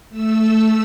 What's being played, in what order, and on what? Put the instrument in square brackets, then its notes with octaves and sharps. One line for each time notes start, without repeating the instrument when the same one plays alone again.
[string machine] A3 E6